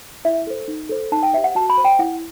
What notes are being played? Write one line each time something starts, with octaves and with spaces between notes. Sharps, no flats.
E4 E5
A4 C5
D#4
A4 C5
D#4 A5
G5
G4 C5 E5
F#5
F#4 A5
B5
C5
G5
E4 F#5